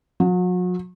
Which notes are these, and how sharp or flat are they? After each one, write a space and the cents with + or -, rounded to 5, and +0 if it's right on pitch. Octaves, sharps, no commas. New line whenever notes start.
F#3 -40